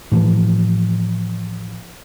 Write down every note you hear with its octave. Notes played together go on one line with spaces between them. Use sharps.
A2 E3 F3